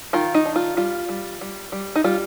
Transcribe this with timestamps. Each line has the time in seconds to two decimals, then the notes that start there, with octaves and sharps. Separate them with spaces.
0.13 D#3 F4
0.35 D#4
0.45 D4
0.56 F4
0.77 G3 F4
1.09 G3
1.41 G3
1.72 G3
1.96 D#4
2.04 G3 F4